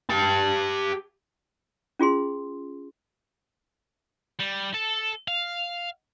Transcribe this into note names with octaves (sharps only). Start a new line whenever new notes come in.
G4 A5
C#4 F4 G#4 C6
G3
A4
F5